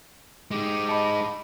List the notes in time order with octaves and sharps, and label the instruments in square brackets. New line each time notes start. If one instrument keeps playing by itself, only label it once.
[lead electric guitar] G#3 D#4 [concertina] G4
[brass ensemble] D#5 [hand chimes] A5 B5